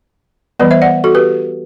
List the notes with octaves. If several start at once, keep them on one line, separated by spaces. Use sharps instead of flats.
E3 G3 B3 B4 D5
C5 E5
D5 F#5
F#4 A4
G4 B4